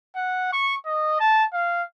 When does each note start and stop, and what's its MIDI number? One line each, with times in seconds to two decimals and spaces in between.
0.15 0.50 78
0.53 0.75 85
0.86 1.17 75
1.20 1.44 81
1.54 1.83 77